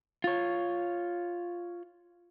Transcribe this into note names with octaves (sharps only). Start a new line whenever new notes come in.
F4 C#5